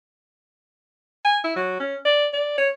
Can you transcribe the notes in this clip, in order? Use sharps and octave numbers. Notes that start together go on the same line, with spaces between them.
G#5
E4
F#3
C#4
D5
D5
C#5